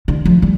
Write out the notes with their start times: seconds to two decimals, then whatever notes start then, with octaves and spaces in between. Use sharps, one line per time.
0.08 D3
0.25 F3
0.42 G3